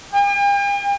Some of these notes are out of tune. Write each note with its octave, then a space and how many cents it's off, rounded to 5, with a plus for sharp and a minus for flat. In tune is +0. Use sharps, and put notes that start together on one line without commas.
G5 +45